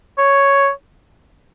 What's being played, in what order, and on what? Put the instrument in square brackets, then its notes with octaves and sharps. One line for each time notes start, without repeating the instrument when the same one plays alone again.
[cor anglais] C#5